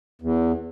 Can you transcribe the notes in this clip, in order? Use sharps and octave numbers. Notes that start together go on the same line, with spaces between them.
E2